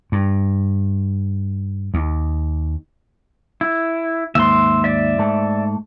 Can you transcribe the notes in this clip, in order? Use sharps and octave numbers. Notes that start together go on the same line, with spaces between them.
G2
D#2
E4
D#2 G#2 E5 C6
D5 E5
G#2 A3